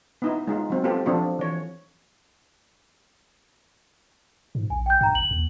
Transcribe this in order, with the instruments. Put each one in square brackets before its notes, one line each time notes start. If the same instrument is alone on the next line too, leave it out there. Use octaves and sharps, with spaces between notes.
[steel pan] B3 D#4 E4
G#3 D#4 F4
F#3 C4
B3 C4 F4 G4 A4
F3 C4 D4 F4 A4
E3 C#5
[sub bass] G#2
[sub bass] A#1 [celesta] G#5
[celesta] G5 G6
[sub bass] G2 [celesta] G5 A#5
[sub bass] G1 [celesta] F#7
[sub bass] D#2